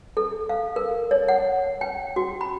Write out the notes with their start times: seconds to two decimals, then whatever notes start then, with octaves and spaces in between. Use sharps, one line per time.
0.17 A4
0.49 F5
0.76 A#4
1.11 C#5
1.28 F#5
1.81 G5
2.16 F#4
2.41 B5